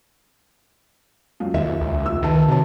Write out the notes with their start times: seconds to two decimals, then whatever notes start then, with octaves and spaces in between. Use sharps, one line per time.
1.40 C#2 F#2
1.54 D#2 E5
1.80 C#2
2.05 F1 E6
2.22 D#3 B4 A5
2.48 C3 F#4 C#5 A5